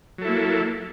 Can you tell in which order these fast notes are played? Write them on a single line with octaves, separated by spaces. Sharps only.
F#3 A4 E4 A#3